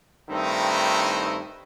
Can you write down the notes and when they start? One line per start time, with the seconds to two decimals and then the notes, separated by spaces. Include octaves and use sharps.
0.30 G2 D#3 A3 C4 D#4 E4